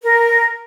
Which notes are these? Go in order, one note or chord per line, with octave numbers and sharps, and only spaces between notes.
A#4